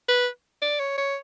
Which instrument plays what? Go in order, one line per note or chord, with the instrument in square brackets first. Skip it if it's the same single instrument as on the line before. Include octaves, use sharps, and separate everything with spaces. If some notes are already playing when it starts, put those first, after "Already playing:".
[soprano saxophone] B4
D5
C#5
C#5